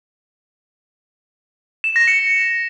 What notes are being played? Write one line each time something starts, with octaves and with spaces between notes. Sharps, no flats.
E7
A#6
C#7
C#7